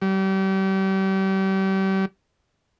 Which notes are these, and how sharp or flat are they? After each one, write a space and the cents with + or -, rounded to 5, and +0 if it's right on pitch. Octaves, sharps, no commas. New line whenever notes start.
G3 -35